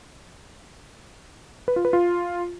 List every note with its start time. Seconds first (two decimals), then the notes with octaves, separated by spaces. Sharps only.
1.68 B4
1.76 F4
1.85 B4
1.93 F4